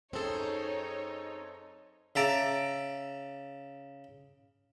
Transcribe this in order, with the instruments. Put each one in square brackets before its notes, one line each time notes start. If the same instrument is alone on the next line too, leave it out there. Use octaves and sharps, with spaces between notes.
[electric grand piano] F#2 A4 [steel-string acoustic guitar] C4 G#4 [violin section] D#4 C#5
[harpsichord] C#3 E5 A5 A#5 D6